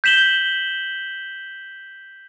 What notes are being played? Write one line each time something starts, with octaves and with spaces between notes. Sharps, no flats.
G6 B6 E7 F#7 G7